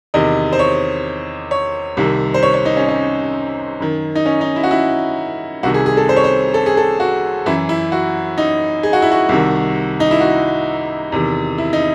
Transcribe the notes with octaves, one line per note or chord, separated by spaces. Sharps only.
E2 C3 D#3 D#5
C5
C#5
C#5
C2 C3 D#3
C5
C#5
C#5
D#4
C#4
C#4
F#2 D#3
D#4
C#4
D#4
E4
F#4
E4
C2 C3 D#3 F#4
G#4
G#4
A4
C5
C#5
C5
A4
G#4
A4
F#4
F#2 E3 E4
E4
F#4
D#4
G#4
F#4
E4
F#4
C2 C3 D#3
D#4
E4
F#4
E2 C3 D#3
E4
D#4